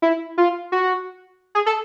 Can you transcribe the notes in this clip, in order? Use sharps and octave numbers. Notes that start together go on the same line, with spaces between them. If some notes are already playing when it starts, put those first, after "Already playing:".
E4
F4
F#4
G#4
A4